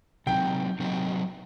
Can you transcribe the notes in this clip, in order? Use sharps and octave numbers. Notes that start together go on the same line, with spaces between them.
C3 F#3 C4 D#4 G5
C3 F#3 C4 D#4